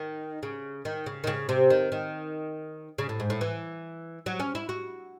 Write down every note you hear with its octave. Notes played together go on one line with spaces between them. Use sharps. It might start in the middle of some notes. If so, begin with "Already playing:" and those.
Already playing: D#3
C#3
D#3
C#3
D#3
C#3
C3
D#3
D#3
C#3
A2
G#2
A2
E3
F#3
C#4
E4
F#4